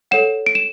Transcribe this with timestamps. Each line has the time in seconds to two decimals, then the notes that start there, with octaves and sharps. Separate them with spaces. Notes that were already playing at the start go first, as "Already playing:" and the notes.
0.11 A4 C#5 F#5 E7
0.46 D7
0.55 E7